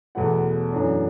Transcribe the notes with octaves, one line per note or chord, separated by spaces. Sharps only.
E2 B2 A3 E4 F#5
F#2 E3 A3 D4